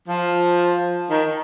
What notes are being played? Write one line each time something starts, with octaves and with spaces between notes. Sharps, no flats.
F3
D#3